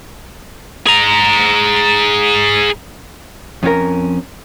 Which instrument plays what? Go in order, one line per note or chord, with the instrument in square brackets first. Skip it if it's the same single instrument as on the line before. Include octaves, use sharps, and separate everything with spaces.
[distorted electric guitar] G#4 A#5
[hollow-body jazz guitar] F2 C#4 F4 A#4